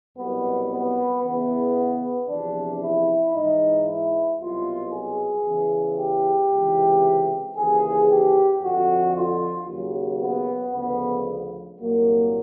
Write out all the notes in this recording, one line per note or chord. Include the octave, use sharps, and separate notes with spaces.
C2 B2 F#3 B3
B3
E2 C#3 E3 B3
E2 C3 F3 D4
E4
G#2 E3 D#4
E4
C2 B2 F#3 F4
G#4
E2 C#3 E3
G4
C#2 C3 E3
D#2 C#3 E3 G#4
G4
F2 D3 F3 F#4
F4
D#2 C#3 F#3
B3
D2 C#3 F3 B3
C2 A#2 F#3 A#3